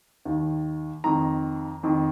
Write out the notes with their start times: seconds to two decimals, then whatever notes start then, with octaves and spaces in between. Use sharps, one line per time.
0.25 D#2 D#3
1.04 F2 D#3 A#5
1.83 F2 D#3